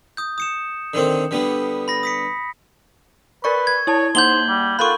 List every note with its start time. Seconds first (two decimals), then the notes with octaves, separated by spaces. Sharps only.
0.17 D#6 G6
0.38 D#6 C#7 E7
0.94 D3 D#3 C4
1.31 D3 G3 B3
1.88 B5 A#6
2.03 D#6 B6 C#7
3.44 A#4 B4 D5 C#6
3.67 G#6
3.87 E4 C#5 A5
4.15 A#3 D#4 C5 F#5 G6 F#7 G7
4.48 G3
4.79 F4 A4 A#4 B5 C#6 F#6